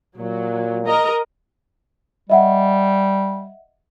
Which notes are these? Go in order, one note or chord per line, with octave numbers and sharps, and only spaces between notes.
A#2 F#3
A#4 D#5 A#5
G3 D#5 E5 F#5